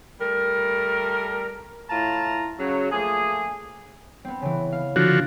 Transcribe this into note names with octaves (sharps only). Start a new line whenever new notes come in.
G3 A3 A#4
A2 E4 F4 A5 A#5
C#3 F#3
F3 A3 A#3 G#4
B3 C4
C#3 E3
F5
D3 F3 F#4